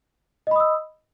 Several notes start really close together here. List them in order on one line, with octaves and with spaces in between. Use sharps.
D#5 B5 D#6 E6